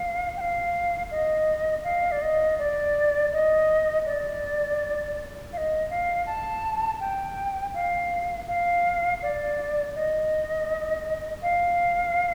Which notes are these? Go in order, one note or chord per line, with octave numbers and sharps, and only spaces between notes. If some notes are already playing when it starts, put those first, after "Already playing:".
Already playing: F5
G5
F5
D#5
F5
D5
D#5
D5
D#5
D5
F5
D#5
F5
A5
G5
F5
F5
D5
D#5
F5